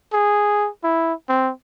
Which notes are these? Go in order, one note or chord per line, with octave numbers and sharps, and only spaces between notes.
G#4
E4
C4